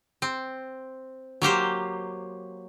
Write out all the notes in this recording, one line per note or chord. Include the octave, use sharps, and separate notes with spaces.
C4
F#3 A#3 G4 C5